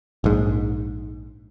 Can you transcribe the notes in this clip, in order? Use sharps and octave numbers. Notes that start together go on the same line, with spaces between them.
A#1 G#2